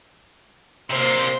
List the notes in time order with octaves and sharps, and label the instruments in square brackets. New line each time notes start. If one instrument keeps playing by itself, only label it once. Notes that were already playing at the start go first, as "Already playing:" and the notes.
[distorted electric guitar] C3 A#3 [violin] C5